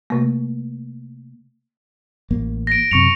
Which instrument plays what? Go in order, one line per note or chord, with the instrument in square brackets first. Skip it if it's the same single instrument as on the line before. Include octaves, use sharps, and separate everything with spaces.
[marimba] C3 A3 A#3
[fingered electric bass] A1 A#3
[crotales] A#6 D7
[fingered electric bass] F#2 C3 [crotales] C#6 C#7 F7